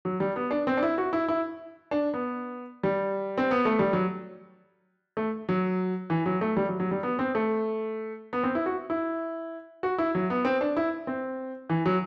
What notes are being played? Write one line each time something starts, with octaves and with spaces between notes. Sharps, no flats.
F#3
G3
B3
D4
C4
D4
E4
F#4
E4
E4
D4
B3
G3
C4
B3
A3
G3
F#3
A3
F#3
E3
F#3
A3
G3
F#3
F#3
G3
B3
C4
A3
B3
C4
E4
F#4
E4
F#4
E4
F#3
B3
C4
D4
E4
C4
E3
F#3